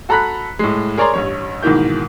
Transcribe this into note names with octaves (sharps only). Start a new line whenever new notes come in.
F#4 A4 A#5 B5 F#6 B6
A2 G#3
G#4 A#4 C#5 D5 A#5 C6
A1 G2 C#5
G#2 B2 D#3 E3 A#3 G6